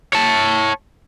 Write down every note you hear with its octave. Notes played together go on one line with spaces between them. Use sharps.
C#5 A5